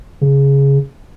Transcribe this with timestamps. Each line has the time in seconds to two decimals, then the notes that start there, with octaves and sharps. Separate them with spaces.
0.21 C#3